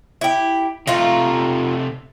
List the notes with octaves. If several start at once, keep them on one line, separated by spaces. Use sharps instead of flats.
E4 G4
C3 A3 D#4 F4